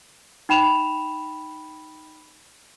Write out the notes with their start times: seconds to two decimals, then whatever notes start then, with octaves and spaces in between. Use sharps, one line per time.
0.49 D#4 G5 B5 E7 F7